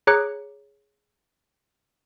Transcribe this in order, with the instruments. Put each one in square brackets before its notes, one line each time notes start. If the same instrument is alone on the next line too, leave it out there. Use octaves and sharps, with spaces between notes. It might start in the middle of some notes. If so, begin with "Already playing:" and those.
[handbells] G#4 C#5 A#5 D6 F#6 C#7